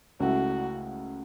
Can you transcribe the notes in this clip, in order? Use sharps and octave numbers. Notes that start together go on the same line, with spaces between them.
C#2 C#3 A3 E4 F#4